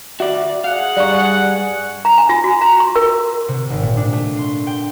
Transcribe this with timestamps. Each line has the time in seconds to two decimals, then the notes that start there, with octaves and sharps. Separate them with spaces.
0.20 F#4 D5 E5
0.64 G#4 F5 F#5
0.97 G2 G3 D5 A#5 C#6
2.05 A#5
2.18 G#5
2.29 F4
2.44 F#4
2.61 A#5
2.80 C6
2.96 A#4
3.48 C3
3.70 G#1
3.83 A#2
3.97 D4
4.13 A3
4.37 C6
4.67 G5